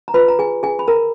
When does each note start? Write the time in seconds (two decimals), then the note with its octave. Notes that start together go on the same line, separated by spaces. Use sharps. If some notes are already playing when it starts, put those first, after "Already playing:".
0.08 A#5
0.14 F4 B4 B5
0.28 A#5
0.39 G#4 G#5
0.63 G#4 G#5
0.79 B5
0.88 A#4 A#5